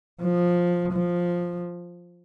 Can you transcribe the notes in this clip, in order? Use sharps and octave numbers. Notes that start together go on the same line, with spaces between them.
F3
F3